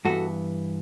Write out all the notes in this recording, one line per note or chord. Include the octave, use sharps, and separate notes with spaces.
G2 E3 B3 F#4 A4